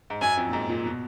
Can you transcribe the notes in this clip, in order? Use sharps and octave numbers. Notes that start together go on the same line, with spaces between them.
G#2
F#2 G#5
F2
A#2
G#2
A#2
B2